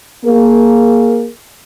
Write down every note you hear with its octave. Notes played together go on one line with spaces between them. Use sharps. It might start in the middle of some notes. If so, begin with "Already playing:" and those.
A#3 G#4 A#4